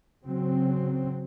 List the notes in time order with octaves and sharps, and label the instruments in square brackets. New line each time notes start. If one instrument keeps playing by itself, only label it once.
[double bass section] C#3 F#3 C4